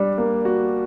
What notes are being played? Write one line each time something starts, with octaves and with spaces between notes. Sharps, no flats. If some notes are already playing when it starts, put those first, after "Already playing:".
Already playing: G3 D4
A#3
F#4